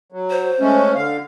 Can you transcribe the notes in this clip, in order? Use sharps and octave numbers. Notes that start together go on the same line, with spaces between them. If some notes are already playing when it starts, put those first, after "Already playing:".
F#3
C5
G#3 A3 C#4
D3 F5